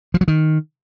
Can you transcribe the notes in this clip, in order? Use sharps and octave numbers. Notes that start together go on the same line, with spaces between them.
F3
F#3
D#3